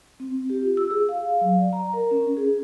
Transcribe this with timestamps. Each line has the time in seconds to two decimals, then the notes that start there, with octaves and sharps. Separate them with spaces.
0.20 C4
0.50 G4
0.63 F4
0.77 E6
0.91 G#4
1.09 F5
1.41 F#3
1.59 D5
1.73 A#5
1.93 A#4
2.11 C#4
2.37 G#4